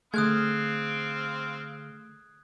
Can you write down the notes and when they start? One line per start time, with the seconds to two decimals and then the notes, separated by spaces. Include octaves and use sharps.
0.14 D3 A3 C4 G#4 F5 D#6 F#6 G#6